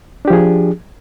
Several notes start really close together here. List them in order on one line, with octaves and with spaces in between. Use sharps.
D4 G4 F3 G#4